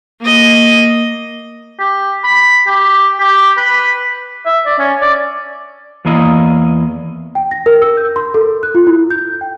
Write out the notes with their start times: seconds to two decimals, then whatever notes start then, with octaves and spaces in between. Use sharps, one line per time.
0.20 A#3 D#5
1.79 G4
2.24 B5
2.67 G4
3.20 G4
3.58 B4
4.46 E5
4.66 D5
4.79 C#4
5.02 D5
6.05 E2 E3 A#3 E4 D#5
7.35 G5
7.51 A#6
7.66 A#4
7.82 E6
7.97 G6
8.16 C6
8.34 A4
8.63 F#6
8.75 F4
8.87 E4
9.10 G6
9.41 G5